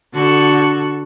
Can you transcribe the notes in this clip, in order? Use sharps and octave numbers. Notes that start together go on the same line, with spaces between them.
D3 F#4 A4